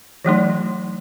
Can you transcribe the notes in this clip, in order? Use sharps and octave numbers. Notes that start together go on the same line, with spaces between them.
E3 F#3 A3 D#4